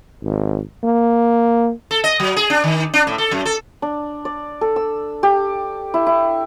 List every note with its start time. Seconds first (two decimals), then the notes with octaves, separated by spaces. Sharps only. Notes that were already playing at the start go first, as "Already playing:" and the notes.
0.23 G#1
0.84 A#3
1.91 A4
2.04 D#5
2.20 F#3
2.36 G#4
2.50 D4
2.64 D#3
2.94 D4
3.07 A2
3.18 A4
3.31 F#2
3.45 A4
3.82 D4
4.25 D5
4.61 A4
4.76 E6
5.23 G4
5.94 E4
6.07 E4